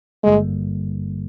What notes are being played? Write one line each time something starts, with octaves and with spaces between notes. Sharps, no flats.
G#1 G2 D3 G3 G#3 A#3